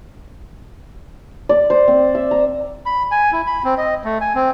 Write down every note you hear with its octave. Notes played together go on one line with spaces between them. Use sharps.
D5
C5
C4
E5
A#5
B5
G#5
E4
B5
C4
D#5
A3
G#5
C4